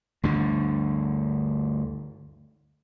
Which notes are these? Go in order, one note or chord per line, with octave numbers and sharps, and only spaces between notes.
D2 G2 D3